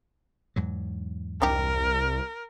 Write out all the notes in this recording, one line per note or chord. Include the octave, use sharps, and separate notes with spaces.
E2 G#2 F#3
C2 D4 D#4 G4 A#4